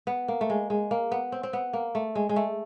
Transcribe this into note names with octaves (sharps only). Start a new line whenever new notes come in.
B3
A#3
A3
G#3
G#3
A#3
B3
C4
C4
B3
A#3
A3
G#3
G#3
A3